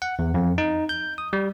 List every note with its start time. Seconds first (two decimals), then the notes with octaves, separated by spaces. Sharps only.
0.02 F#5
0.19 E2
0.34 F2
0.58 D#4
0.89 G6
1.18 D#6
1.33 G3